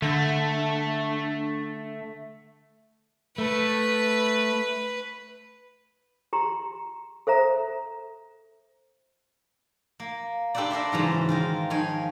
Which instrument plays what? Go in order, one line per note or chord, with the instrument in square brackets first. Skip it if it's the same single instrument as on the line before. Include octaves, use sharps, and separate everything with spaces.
[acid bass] D3 [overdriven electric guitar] A3 [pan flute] D4
[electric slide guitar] A3 [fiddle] B4
[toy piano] G4 A#5 C6
A4 C5 E5 A#5
[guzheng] A#3
D4 G4 A4 B4 C5 D5
A#4 C5 D5 E5
G#2 C#3 E3 F#3
D#3 F4 A#4
D#3 F3 C#5 G#5